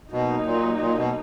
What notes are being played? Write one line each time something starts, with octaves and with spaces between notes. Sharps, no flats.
B2 F#3 A#3 D#4
A#2
A#2
B2